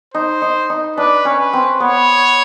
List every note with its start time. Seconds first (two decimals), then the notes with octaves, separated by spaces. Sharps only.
0.14 D#4 C5
0.42 D#4
0.70 D#4
0.97 D4 B4
1.25 C#4
1.39 B4
1.53 C4
1.80 B3 C#5